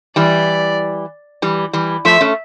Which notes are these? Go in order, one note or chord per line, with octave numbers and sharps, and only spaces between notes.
E3 G3 D5
E3 G3
E3 G3
F3 A3 E5
A3 C#4